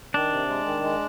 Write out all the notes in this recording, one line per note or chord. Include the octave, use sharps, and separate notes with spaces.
D#3 D4
C3
G#3
D#3
G#3